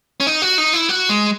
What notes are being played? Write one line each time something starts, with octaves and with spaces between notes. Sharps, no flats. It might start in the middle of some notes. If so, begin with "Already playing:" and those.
C#4
D#4
F#4
D#4
E4
F#4
G#3